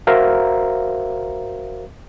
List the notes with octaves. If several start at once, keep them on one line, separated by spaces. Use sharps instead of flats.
F#4 A#4 C5 E5 F5 A#5